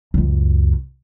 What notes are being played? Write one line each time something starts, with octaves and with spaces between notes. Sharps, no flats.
C#2 F#2